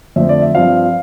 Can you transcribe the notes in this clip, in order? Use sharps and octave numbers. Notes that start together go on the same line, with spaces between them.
F2 D3 A3 C4 E5
D5
E5
G2 F3 C4 F5